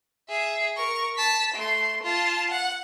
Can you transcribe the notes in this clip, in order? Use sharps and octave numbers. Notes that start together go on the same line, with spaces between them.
G#4 E5
A#4 C#6
A5 B6
A3 C6
F4 A5
F#5